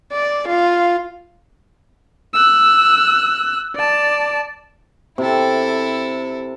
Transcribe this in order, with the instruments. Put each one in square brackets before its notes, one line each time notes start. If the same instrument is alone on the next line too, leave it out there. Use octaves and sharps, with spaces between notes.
[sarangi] D5
F4
[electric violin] E6 F#6
D5 A5
[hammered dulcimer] C3 [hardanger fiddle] E4 A4